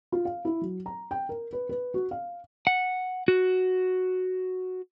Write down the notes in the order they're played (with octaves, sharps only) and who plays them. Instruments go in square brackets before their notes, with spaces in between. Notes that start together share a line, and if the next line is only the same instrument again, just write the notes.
[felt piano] F4
F5
E4
F#3
A#5
G5
A#4
B4
B4
F#4
F5
[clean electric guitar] F#5
F#4